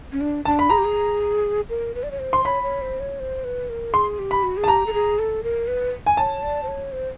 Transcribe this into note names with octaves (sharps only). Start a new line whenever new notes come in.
C#4
D4
D4 A5
B5
G#4 A#5
G4
G#4
A#4
B4
D5
C#5
C5
C6
C#5 B5
C#5
C5
C#5
C5
B4
A#4
G#4 C6
G4
B5
F#4
G#4
A5
G4 A#5
A4
G#4
A4
A#4
B4
G#5
C#5 A5
D5
C5
C#5
C5